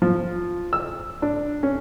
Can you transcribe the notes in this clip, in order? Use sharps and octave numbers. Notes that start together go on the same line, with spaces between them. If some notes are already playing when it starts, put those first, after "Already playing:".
F3
E6
D4
C#4